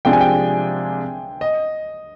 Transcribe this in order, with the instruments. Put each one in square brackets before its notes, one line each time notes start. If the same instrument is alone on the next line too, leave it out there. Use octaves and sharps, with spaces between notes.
[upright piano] C3 F3 G#3 D4 G#4 [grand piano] G5
[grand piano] G#5
G5
D#5